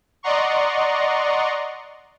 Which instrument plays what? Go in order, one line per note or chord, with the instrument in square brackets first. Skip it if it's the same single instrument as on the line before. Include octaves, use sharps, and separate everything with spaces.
[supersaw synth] D5 D#5 F#5 A#5 C6 C#6